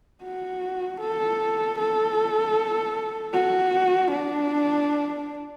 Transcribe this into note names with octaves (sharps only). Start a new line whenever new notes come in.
F#4
A4
A4
F#4
D4